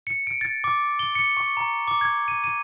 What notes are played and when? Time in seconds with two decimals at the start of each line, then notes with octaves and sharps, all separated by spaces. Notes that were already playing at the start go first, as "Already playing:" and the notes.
0.07 C#7
0.27 D7
0.41 A6
0.64 D6
0.99 G7
1.15 C#7
1.37 C#6
1.57 A#5
1.88 D6
2.01 G#6
2.28 D#7
2.44 D#7